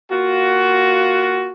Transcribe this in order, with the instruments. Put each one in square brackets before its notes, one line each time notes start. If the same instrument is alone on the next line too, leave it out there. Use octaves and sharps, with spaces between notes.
[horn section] A#3 F4 F#4